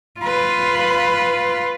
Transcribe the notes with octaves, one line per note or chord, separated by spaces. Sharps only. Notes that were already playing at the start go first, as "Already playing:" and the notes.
F4 B4